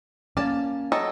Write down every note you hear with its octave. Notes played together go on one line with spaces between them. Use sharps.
A#3 C#4 D5 A5
F#3 A4 D#5